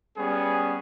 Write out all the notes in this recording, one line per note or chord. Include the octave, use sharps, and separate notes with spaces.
G3 B3 C#4 G#4